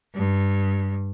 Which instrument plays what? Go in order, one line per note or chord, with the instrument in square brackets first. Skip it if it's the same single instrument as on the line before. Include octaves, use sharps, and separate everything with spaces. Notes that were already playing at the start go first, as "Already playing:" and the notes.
[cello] G2